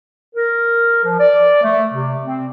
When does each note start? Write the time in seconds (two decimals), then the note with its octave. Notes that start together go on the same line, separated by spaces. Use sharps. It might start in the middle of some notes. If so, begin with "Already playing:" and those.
0.35 A#4
1.04 F3
1.19 D5
1.63 A3
1.94 C3
2.24 C4